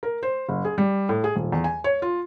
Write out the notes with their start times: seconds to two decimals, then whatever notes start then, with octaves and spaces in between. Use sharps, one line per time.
0.03 A#4
0.23 C5
0.49 F#1
0.65 G#4
0.78 G3
1.09 A2
1.24 G#4
1.36 D#1
1.52 E2
1.64 G#5
1.84 C#5
2.02 F4